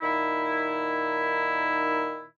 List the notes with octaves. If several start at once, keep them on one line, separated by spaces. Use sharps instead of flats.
A#2 D#3 D#4 E4